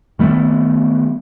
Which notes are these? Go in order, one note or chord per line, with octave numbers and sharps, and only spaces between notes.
D#3 G3 A3 B3